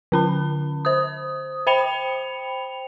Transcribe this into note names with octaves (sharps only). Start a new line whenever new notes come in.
D3 C#4 B5
C5 D#6
C5 G5 B5 C#7 F7